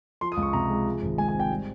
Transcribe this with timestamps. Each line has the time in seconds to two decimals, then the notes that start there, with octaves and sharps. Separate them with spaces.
0.21 F3 C6
0.32 D#6
0.37 C#2
0.42 C#6
0.53 C3 A#5
0.70 G#3
0.86 F3
1.02 G#1
1.18 G#2 G#5
1.29 G#5
1.34 C4
1.40 G5
1.50 G3